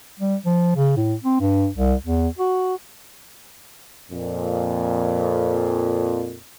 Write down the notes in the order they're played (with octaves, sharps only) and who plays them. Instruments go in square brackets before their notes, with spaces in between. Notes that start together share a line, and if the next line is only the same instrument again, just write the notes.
[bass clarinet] G3
F3
C#3
A2
C4
G2
C2
E2
F#4
[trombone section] F2 A#2